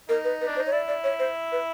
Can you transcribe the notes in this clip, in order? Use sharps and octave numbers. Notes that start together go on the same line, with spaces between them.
D#4 A#4
B4
B4
D4
C5
D#4
C#5
E4 D5
D5
C#5
C5
B4